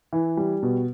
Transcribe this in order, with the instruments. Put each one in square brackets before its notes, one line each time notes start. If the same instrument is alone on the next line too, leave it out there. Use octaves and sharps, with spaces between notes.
[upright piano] E3
G3
B2